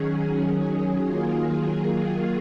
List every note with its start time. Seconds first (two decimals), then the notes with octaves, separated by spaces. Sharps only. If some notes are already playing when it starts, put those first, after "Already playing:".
Already playing: D#3 F#3 C#4 G#4
1.06 D#3 F#3 A#3 F4 G#4